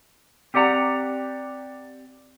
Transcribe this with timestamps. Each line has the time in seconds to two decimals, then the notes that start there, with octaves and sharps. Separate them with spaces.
0.54 C4 G4 D5 F#5 A#5